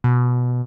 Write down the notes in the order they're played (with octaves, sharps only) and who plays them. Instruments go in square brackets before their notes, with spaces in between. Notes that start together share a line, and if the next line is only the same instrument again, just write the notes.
[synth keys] B2